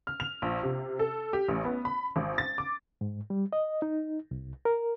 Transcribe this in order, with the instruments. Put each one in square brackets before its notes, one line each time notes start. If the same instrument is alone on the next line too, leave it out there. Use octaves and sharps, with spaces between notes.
[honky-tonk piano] F6
F7
A#1
C3
A4
G4
A1
B3
B5
G#1
A6
D6
[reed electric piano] G#2
G3
D#5
D#4
C2
A#4